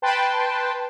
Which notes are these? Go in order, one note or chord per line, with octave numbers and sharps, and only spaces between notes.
B4 G5 A5 C6